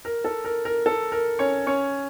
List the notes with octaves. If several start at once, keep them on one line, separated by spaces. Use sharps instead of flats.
A#4
A4
A#4
A#4
A4
A#4
C#4 C#5
C#4 C#5